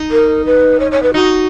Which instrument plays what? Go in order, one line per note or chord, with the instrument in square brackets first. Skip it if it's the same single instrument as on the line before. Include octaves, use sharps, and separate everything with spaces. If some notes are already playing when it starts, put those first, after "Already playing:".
Already playing: [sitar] D#4
[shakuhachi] A#4
B4
C#5
C#5
B4
[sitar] D#4 [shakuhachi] F#4